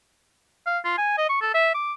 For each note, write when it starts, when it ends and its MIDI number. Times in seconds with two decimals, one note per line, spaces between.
0.66 0.79 77
0.85 0.93 65
0.98 1.17 80
1.18 1.28 75
1.29 1.40 85
1.42 1.52 69
1.55 1.71 76
1.74 1.93 86